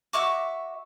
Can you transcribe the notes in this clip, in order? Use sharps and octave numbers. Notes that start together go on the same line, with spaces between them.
F#4 E5 C#6 D6